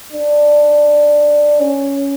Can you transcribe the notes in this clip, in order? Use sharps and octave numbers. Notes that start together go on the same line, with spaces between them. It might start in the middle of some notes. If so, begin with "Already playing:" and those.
D4
C#4